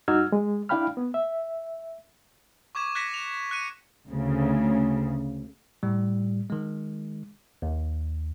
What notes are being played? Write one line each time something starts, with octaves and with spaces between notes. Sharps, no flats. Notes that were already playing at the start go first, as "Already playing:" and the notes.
G2 D#4 F#4 E6 F6 G#6
G#3
D4 E4 F5 G5 B5 F6
B3
E5
C#6 D6 G#6 E7
F#6 G#6 A#6 B6 C#7 E7
F7
F#6 C#7 D#7
D2 C#3
A2 G3
D#3 G#3
D#2